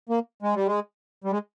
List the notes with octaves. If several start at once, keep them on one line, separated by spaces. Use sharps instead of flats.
A#3
G#3
G3
G#3
G3
G#3